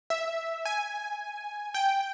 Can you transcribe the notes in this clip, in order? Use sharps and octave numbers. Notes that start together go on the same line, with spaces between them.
E5
G#5
G5